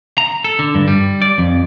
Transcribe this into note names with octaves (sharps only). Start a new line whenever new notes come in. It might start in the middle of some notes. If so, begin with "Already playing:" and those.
A#5
A4
D3
G2
G3
D5
F2